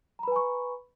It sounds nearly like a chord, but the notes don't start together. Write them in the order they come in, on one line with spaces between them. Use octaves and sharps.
A#5 B5 B4 G#5 C#6